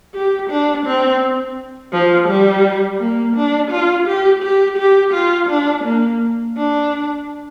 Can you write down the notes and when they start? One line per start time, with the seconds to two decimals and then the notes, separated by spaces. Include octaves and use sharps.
0.14 G4
0.50 D4
0.87 C4
1.93 F3
2.28 G3
3.00 A#3
3.36 D4
3.71 F4
4.07 G4
4.43 G4
4.78 G4
5.13 F4
5.49 D4
5.84 A#3
6.56 D4